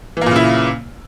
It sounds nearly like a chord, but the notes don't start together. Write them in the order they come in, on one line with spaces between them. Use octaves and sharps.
E3 A#3 A#2 C#3 E4